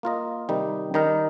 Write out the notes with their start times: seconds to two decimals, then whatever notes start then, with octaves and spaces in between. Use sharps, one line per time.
0.03 A#3 F4 A#4 D#5
0.49 C3 D#3 G3 D#4
0.94 D#3 G3 D#4 A#4